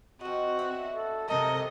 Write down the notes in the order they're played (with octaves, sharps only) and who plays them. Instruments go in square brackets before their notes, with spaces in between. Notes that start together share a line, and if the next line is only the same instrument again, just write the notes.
[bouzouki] F3 D#5 [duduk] C4 [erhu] F#4
[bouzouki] B3 D4 E5
[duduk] A4
[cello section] C3 A4 [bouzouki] F#3 D#4 [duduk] A#4 [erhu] D#5